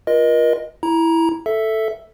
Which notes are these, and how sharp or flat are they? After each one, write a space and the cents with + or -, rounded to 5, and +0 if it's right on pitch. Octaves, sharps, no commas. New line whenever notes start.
F4 +0 A#4 +40 D#5 +0
E4 +0 A#5 +20
A4 +0 E5 +0